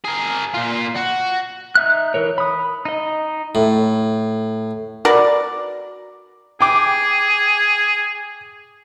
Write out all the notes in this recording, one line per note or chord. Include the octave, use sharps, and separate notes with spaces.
G#4 A#4
A#2 F4
F#4
D#4 E5 F#6
E3 A#4 C#5
B5 D#6
D#4 D#5
A2
F#4 A#4 B4 D5
G#4 G5 D6